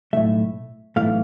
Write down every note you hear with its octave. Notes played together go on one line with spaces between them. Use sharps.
B1 A2 E3 A3 E5
B1 A2 E3 A3 F5